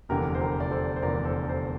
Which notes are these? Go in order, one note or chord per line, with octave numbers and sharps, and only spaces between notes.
F1 E2 D3 G4 A#4
C5
G4 A#4
D5
A4 C5
C5
F1 E2 D3 A#4 D5
A4 C5
A4 C5